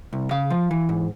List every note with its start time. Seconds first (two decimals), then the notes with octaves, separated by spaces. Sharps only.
0.13 C2
0.31 C#3 F5
0.50 F3
0.71 E3
0.89 G#2